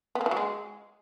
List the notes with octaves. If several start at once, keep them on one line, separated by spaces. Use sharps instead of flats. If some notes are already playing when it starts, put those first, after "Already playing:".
B3
A#3
E3
F#3
G#3